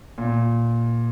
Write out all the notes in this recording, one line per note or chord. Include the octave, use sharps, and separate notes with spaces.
A#2